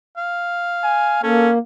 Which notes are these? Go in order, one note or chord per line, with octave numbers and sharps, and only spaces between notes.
F5
G#5
A#3 C#4 A4